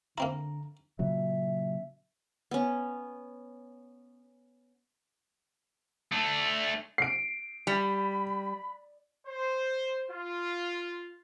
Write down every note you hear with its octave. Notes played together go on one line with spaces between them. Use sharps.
D3 A#3 C4 E4 A#5
A#2 C#3 F#3 E5
B3 C#4
A3 D4
C7 D7
G3 B5
C5
F4